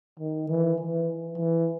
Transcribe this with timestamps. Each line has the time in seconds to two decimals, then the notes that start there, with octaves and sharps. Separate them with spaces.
0.19 D#3
0.49 E3
0.78 E3
1.37 E3